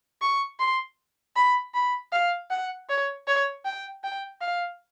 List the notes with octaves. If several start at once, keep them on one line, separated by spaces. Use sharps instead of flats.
C#6
C6
B5
B5
F5
F#5
C#5
C#5
G5
G5
F5